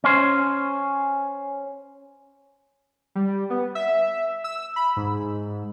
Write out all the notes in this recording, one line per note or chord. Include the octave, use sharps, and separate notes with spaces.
C#4 C5
G3
B3
E5
E6
B5
G#2